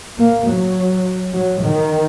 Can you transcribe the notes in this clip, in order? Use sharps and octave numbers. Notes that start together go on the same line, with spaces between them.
A#3
F#3
F#3
D#3